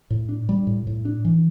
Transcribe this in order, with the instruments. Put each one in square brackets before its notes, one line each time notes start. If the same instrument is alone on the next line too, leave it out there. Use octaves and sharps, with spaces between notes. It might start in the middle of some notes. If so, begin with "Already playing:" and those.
[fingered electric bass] A2
D4
G3
A2
A2
D4
E3